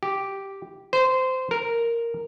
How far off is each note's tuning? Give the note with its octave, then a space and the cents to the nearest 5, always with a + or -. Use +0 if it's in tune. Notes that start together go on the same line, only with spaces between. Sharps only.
G4 -5
C5 -15
A#4 -5